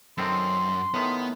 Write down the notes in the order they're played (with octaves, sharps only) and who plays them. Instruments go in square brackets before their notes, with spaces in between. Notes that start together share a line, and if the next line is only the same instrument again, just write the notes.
[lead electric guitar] F#2 [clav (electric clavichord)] D#3 C4 A4 [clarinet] C6
[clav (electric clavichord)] A2 D#3 [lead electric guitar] B3